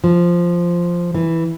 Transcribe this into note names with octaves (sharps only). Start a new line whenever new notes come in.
F3
E3